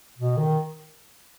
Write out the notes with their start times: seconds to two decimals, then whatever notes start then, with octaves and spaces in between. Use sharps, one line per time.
0.18 B2
0.37 D#3